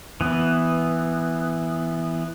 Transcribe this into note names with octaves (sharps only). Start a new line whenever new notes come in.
E3 B3